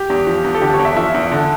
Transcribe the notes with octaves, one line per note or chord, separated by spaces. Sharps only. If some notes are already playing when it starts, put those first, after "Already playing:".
Already playing: G4
E2
F3
E2
A4
D3 G4
C#5
E2
E5
F3 E5
E2
D3